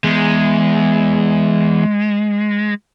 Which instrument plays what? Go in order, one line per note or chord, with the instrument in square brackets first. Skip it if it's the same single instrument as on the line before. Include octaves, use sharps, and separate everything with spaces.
[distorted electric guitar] E2 [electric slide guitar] G#3